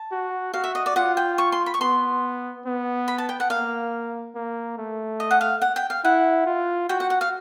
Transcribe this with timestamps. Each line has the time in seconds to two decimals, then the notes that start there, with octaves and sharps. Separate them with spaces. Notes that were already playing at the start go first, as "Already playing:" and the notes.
Already playing: A5
0.12 F#4
0.54 F#4 F5
0.64 E5
0.75 D#5
0.86 D5
0.96 F4 F#5
1.17 G5
1.38 C#6
1.52 C6
1.66 B5
1.74 C#6
1.81 B3 C6
2.66 B3
3.08 B5
3.18 A5
3.29 G5
3.40 F#5
3.50 A#3 F5
4.35 A#3
4.78 A3
5.20 D#5
5.31 F#5
5.41 F5
5.62 F#5
5.76 G5
5.90 F5
6.04 E4 F#5
6.46 F4
6.89 F#4 G5
7.00 F#5
7.10 F#5
7.21 F5